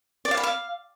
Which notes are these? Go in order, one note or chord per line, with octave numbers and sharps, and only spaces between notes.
D5
F5
B5
F5